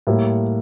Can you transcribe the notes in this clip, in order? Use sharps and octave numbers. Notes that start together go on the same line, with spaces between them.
A2 G3 A#3